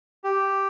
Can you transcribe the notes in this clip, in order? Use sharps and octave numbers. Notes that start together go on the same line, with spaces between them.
G4